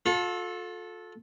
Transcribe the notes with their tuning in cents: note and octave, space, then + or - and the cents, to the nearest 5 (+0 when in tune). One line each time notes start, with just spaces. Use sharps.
F4 +40 A4 -10